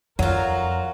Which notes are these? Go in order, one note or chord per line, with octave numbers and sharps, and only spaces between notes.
F2 F#3 F4 F#4 A#4